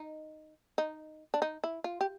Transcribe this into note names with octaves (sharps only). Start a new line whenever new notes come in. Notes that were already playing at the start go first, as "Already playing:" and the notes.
Already playing: D#4
D#4
D4
D#4
E4
F4
G4